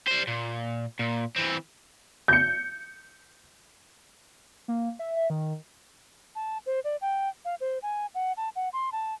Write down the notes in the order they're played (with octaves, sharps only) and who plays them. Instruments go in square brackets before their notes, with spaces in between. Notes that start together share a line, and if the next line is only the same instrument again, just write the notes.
[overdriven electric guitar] G3 C5
A#2
A#2
E3 C4
[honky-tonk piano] G6 C#7
[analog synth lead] A#3
E5
E5
D#3
[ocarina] A5
C5
D5
G5
F5
C5
G#5
F#5
A5
F#5
C6
A5